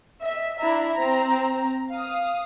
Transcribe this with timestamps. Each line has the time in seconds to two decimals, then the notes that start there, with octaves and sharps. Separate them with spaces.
0.21 D#5 E5
0.59 D4 E4 E5 A#5
0.93 C4 A#5
1.89 F5 D#6